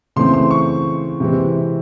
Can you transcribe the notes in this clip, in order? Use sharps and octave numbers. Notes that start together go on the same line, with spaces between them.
C#3 E3 A3 C4 C6
C6
C#6
C3 E3 G#3 C4